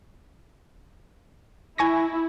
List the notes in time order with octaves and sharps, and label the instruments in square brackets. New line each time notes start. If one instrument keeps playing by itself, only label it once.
[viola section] E4 [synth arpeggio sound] G#5 C#6 A#6